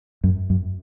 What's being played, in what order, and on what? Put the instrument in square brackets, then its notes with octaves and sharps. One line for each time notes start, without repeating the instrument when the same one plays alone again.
[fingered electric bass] F#2
F#2